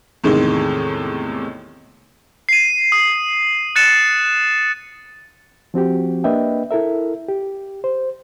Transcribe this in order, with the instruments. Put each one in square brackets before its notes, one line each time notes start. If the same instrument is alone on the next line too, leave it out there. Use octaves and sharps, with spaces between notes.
[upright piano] E2 A2 C3 D#3 G#3 D#4
[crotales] C7 D#7
D#6
F#6 A6 C#7 E7
[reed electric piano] F3 C4 F#4 G4
A#3 D4 B4 D#5 E5 G5
E4 A4 A#4 E5
G4
C5